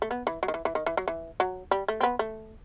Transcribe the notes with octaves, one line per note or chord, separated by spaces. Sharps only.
A3
B3
E3
F#3
D#3
E3
E3
D#3
E3
F#3
E3
F#3
G3
A3
C4
B3
A3